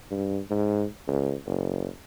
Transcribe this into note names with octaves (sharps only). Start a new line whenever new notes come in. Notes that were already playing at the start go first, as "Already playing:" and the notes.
G2
G#2
C#2
F#1